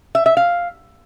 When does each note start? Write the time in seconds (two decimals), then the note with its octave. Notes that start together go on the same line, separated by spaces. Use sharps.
0.15 E5
0.26 E5
0.37 F5